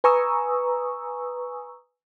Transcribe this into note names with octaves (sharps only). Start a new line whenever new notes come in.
B4 G#5 A#5 C#6 D#6 E6